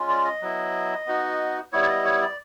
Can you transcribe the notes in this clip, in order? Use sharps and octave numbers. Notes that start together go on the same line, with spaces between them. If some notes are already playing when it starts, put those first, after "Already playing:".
Already playing: G#3 C#4 F4
D5
D#5
F#3 B3 E4
B3 D#4 F#4
G3 B3 E4 C#5
D5
D#5
C#5
D5